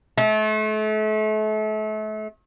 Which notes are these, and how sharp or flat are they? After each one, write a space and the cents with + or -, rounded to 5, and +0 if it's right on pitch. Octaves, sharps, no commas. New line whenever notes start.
A3 -35